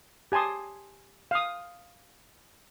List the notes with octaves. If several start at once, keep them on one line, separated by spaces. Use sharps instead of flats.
G4 G#5 A5 C6 D#6
F5 D#6